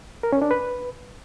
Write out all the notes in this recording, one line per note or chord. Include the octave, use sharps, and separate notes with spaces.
A#4
C#4
D4
B4